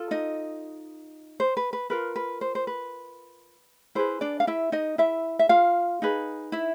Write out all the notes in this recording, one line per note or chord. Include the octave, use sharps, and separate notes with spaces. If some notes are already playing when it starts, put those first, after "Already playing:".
Already playing: F4 A4
D#4 D#5
C5
B4
B4
F4 A#4 B4
B4
C5
C5
B4
E4 G#4 B4 C5
D4 D5
F5
E4 E5
D#4 D#5
E4 E5
E5
F4 F5
D#4 G#4 B4
E4 E5